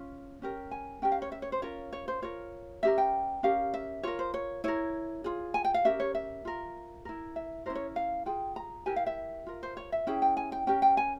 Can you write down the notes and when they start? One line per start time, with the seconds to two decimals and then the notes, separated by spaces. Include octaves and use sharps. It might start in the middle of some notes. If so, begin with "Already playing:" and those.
Already playing: C#4 F4
0.42 C#4 G4 A#4
0.71 G#5
1.02 C#4 G4 A#4 G5
1.12 F5
1.22 C#5
1.32 E5
1.42 C#5
1.52 C5
1.62 C#4 F4 A#4 C#5
1.93 C#5
2.08 C5
2.22 F4 A#4 C#5
2.83 C#4 G4 A#4 E5
2.98 G5
3.43 C#4 G4 A#4 F5
3.74 E5
4.03 F4 A#4 C#5
4.19 C5
4.34 C#5
4.64 E4 A#4 C#5
5.24 F4 G#4
5.54 G#5
5.65 G5
5.74 F5
5.85 C#4 G4 A#4 E5
6.00 C#5
6.15 E5
6.45 F4 A#4
7.05 E4 A#4
7.36 E5
7.66 C#4 E4 A#4 C5
7.75 C#5
7.96 F5
8.26 F4 G#4 G5
8.56 A#5
8.86 E4 G4 A#4 G#5
8.96 F5
9.06 E5
9.46 F4 A#4
9.63 C5
9.77 C#5
9.92 E5
10.07 C#4 E4 G#4 G5
10.22 G5
10.37 G#5
10.52 G5
10.67 C#4 G4 A#4 G5
10.82 G5
10.97 G#5